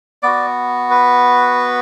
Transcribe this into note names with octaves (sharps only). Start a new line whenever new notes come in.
B3 F#4 D5
B4